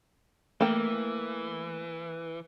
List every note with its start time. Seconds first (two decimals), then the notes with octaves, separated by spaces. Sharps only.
0.61 E3 A3 A#3 A4 G5